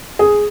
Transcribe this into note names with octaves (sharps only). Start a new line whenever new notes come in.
G#4